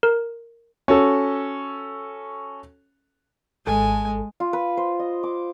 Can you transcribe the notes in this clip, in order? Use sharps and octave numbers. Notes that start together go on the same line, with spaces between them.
A#4
C#4 F#4 A4
G#1 G#3 A4 G#5 A5
F4
B4
C5
D#5
D6